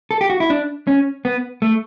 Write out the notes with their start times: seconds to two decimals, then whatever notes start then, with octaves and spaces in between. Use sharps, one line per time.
0.11 A4
0.21 G4
0.30 F#4
0.40 E4
0.50 D4
0.87 C#4
1.25 B3
1.62 A3